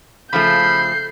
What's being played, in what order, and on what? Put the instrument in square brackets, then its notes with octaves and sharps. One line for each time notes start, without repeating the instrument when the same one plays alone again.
[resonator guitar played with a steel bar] C#3 F3 A3 [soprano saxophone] B5 [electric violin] G6 C7